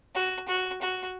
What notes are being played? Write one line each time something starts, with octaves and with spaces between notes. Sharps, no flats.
F#4
F#4
F#4